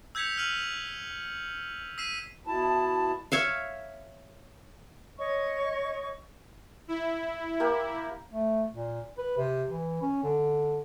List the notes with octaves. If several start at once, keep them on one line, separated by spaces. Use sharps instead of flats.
E6 G6 G#6 B6 C#7 F7
F6 D#7 F#7
E6 B6 C7 D#7 E7
B2 E4 A5
C#5 E5 F5
C#5 D#5 C#6
E4
A#3 G4 A#4
A3
A#2
B4
C3
E3
C#4
D3